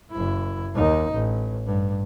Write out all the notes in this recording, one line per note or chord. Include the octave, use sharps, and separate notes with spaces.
F#1 E4
D#2 D#4
A1
G2